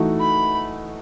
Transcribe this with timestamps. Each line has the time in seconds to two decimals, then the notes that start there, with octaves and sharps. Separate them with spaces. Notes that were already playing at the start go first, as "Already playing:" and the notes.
Already playing: E3 A3 D#4 F#4
0.20 B5